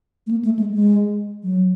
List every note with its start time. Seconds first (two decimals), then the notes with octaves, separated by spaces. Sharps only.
0.27 A3
0.31 A#3
0.45 A3
0.59 G#3
0.74 G#3
1.44 F#3